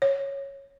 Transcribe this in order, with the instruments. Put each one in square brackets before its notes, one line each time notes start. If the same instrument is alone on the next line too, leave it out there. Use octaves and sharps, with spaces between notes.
[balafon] C#5